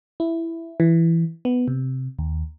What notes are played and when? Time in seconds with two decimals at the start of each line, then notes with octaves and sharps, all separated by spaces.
0.20 E4
0.80 E3
1.45 B3
1.68 C3
2.19 D#2